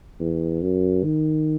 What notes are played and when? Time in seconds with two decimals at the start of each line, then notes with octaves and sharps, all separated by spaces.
0.20 E2
0.62 F#2
1.04 D#3